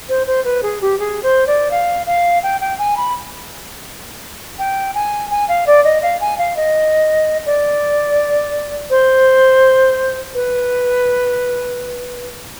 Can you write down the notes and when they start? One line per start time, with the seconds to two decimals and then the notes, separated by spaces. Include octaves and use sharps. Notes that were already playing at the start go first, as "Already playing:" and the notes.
0.09 C5
0.27 C5
0.45 B4
0.63 G#4
0.81 G4
0.99 G#4
1.23 C5
1.47 D5
1.71 F5
2.07 F5
2.43 G5
2.61 G5
2.79 G#5
2.97 B5
4.59 G5
4.95 G#5
5.31 G#5
5.49 F5
5.67 D5
5.85 D#5
6.03 F5
6.21 G#5
6.38 F5
6.57 D#5
7.46 D5
8.90 C5
10.34 B4